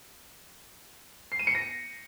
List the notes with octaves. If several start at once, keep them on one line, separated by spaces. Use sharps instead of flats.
C7
D#7
C#7
A#6